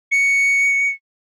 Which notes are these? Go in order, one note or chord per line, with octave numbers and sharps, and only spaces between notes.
C#7